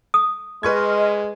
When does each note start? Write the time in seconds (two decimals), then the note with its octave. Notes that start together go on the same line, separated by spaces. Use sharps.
0.14 D#6
0.63 G#3 B4 D#5 C6 C#6 F6 G#6